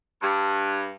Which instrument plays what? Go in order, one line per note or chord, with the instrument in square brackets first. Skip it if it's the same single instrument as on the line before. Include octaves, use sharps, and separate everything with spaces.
[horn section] G2